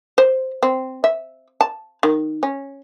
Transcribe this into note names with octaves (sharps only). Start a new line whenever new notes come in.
C5
C4
E5
A5
D#3
C#4